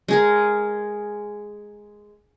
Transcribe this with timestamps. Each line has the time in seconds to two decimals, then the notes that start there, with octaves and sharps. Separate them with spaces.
0.08 G#3 G#4 A#4